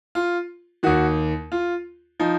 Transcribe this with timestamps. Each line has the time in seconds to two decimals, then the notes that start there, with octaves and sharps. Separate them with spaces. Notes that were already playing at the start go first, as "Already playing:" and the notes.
0.15 F4
0.83 D#2 D#3 F#4
1.52 F4
2.20 F3 D#4